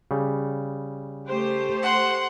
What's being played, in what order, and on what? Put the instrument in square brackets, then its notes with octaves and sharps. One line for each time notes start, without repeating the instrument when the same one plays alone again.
[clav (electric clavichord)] C#3 G3
[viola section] A3 G4 C5
[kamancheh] F#5 C6